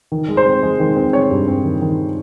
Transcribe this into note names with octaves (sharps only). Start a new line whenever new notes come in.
D#3
G#3
C5
C4
G#3
D#3
C4
C4 C#5
G2
C4
D#3
D#3